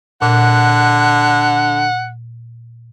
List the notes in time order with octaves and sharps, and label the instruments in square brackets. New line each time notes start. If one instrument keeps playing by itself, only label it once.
[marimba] A#2 [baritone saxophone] D3 [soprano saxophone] F#5